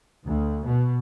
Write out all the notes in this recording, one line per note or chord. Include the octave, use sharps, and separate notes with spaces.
D2
B2